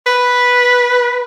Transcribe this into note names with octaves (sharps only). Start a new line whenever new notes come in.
B4